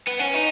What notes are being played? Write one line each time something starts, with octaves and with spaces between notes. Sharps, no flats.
B3
C#4
D#4